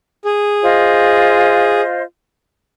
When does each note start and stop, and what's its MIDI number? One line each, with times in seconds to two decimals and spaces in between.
0.25 1.81 68
0.62 2.02 65
0.62 2.02 72
0.62 2.02 75